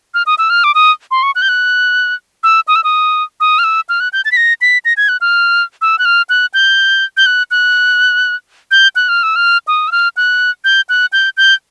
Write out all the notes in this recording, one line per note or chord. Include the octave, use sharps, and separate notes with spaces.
F6
D#6
E6
F6
D6
D#6
C6
C#6
F#6
G6
F#6
E6
D#6
E6
D#6
D#6
F6
E6
F6
F#6
G6
A6
B6
A#6
B6
A#6
G#6
F#6
F6
E6
F#6
F6
F#6
G6
G6
F#6
F#6
G6
F#6
F6
E6
F6
D#6
E6
F6
F#6
G6
F#6
G6
G6